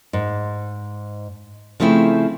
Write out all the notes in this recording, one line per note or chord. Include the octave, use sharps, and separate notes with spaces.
G#2
C#3 F3 A3 C4 E4